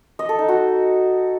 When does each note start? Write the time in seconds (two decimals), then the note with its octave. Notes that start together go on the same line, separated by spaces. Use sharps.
0.19 D#5
0.29 A4
0.39 D#4
0.48 F#4